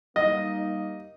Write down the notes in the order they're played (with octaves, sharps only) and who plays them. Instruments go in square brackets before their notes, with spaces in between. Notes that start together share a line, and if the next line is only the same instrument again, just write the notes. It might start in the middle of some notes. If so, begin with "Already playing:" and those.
[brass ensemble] G3 A#3 D#4 [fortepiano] D#5